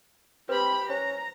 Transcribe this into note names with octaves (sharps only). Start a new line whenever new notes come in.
C4 G4 B4 B5
C#4 C5 A#5